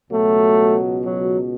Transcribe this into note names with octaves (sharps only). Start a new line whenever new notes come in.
C#2 B2 F#3 A3
F#3